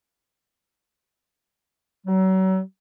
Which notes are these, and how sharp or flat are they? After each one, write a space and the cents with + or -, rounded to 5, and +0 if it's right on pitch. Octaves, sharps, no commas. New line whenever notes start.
F#3 +35